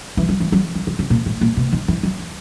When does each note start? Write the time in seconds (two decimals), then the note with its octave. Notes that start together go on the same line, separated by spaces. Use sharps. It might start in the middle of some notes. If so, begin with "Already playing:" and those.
0.17 E3
0.29 F#3
0.40 E3
0.52 F#3
0.75 E3
0.87 C#3
0.99 C#3
1.10 A#2
1.26 G#2
1.41 A#2
1.57 B2
1.73 D#3
1.88 E3
2.03 F#3